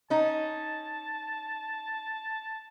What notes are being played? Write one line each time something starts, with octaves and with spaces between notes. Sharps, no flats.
C#4 D#4 A5